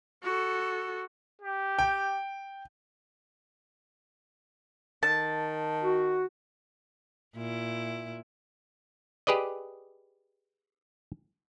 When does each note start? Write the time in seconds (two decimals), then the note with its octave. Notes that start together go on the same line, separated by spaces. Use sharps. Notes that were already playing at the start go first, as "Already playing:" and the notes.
0.23 F#4 A4
1.42 G4
1.79 G5
5.03 D#3 A5
5.83 F#4
7.35 A#2 E4
9.27 G4 G#4 B4 D5 D#5